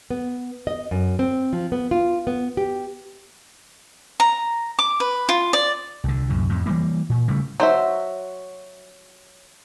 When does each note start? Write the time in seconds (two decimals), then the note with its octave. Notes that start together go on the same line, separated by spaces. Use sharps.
0.10 B3
0.67 D#5
0.91 F#2
1.19 C4
1.53 F3
1.72 B3
1.91 F4
2.27 B3
2.57 G4
4.20 A#5
4.79 D6
5.00 B4
5.29 F4
5.53 D5
6.04 C2 D3
6.30 C2 F#2 A#2
6.49 F2 A2
6.66 E3 G3 A#3
7.09 A#2
7.28 C#3 G3 A3
7.60 F#3 F#4 C5 E5